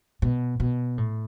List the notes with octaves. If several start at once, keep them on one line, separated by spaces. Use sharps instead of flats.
B2
B2
A2